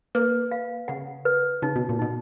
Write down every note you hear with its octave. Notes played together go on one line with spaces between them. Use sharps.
A#3 B4
F5
C#3 F#5
B4
C#3 D#4
B2
A#2
B2 D#4